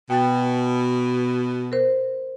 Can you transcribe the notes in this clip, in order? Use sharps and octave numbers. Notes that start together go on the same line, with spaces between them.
B2 G5 A6
A#4 C5